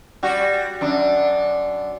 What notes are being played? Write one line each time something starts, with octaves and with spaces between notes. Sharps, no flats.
G3 F#4
F#2 D4